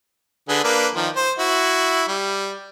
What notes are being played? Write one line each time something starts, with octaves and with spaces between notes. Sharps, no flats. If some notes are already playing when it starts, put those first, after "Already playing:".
D3 G#4 B4
A#3 D4 B4
D#3 F3
C5
E4 F#4
G3